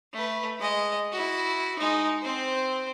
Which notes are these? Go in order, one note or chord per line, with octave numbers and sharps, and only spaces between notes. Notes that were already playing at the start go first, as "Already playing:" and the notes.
A3 B4
G#3 D#5
E4 F#4
G#3 D#4
C4 C5